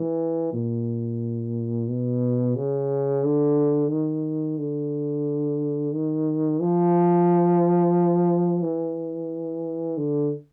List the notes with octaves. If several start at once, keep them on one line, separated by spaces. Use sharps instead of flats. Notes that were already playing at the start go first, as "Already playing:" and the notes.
Already playing: E3
A#2
B2
C#3
D3
D#3
D3
D#3
F3
E3
D3